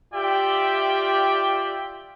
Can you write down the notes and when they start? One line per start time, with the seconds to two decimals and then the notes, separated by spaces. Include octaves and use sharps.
0.14 F4 G4 D5 E5 G5